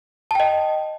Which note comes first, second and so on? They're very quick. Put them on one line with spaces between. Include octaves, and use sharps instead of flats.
A5 G5 D#5